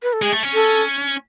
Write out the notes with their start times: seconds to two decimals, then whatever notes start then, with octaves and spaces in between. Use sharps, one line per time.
0.03 B4
0.13 A4
0.22 G#3 G#4
0.32 A3
0.43 C#4
0.54 A4